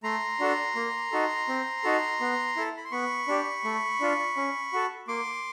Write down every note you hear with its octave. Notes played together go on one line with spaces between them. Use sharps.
A3 A#5 C6
D4 F#4 A4
A#3
D#4 F#4 A4
C4
D#4 F#4 A4
B3
E4 A4
B5
C6
B3 B5 C#6
D4 G4
A3
D4 F4
C#4
F#4 A4
A#3 C6 D6